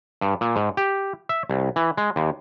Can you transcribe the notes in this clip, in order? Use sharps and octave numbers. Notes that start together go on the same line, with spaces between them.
G2
A#2
G#2
G4
E5
C2
E3
G#3
D#2